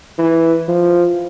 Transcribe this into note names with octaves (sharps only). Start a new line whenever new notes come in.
E3
F3